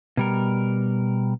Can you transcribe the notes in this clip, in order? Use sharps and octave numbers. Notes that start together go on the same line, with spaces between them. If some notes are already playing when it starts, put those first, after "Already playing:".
B2 G3 A#4